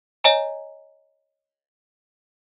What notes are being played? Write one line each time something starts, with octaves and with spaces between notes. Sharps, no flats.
C#5 D#5 G#5 A#5